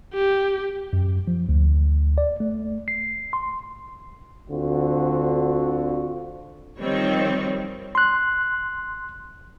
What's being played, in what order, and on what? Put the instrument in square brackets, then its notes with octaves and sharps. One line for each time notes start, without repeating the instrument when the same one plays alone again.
[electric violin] G4
[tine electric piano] F#2
F3
D2
D5
A3
C7
C6
[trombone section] D2 D3 C4 F4 F#4
[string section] D#3 F3 G3 C4 C#5
[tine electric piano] C6 F#6